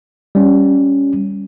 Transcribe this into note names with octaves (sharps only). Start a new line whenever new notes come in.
G3 C#4